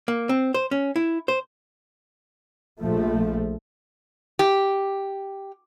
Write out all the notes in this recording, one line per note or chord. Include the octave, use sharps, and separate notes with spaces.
A#3
C4
C5
C#4
E4
C5
A#1 F3 A3
G4